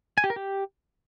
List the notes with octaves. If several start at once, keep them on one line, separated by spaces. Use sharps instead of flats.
G#5
G4
A#4
G4